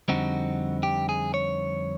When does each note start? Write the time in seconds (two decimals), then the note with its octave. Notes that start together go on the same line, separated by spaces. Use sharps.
0.08 F2 D3 G3 C4 D#4 F#4
0.83 G4
1.09 G#4
1.34 C#5